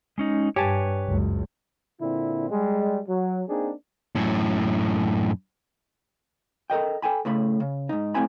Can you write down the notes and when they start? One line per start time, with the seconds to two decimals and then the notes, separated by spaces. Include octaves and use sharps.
0.18 G#3 C#4 D#4
0.56 G2 G4 B4 C#5 G#5 A5
1.07 F#1 C#2
2.01 A#2 D3 C4 E4
2.50 G3 G#3
3.07 F#3
3.48 A#3 C4 D4 D#4 G#4
4.15 F#2 A2
6.70 A4 A#4 D#5 G5
7.02 A4 G5 G#5 B5
7.25 A2 C#3 A3 B5
7.60 C#3
7.89 G#2 D#4
8.14 A#2 A3 C4 E4 G#5 B5